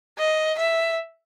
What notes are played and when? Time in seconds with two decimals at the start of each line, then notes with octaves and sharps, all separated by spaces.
0.18 D#5
0.58 E5